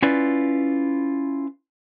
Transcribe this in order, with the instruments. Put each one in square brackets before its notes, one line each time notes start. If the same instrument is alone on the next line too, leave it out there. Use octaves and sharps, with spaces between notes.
[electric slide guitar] C#4 E4 F4 B4 D5